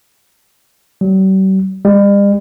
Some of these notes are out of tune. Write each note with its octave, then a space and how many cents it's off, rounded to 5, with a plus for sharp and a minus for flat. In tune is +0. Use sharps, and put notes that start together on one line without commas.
G3 -45
G3 +45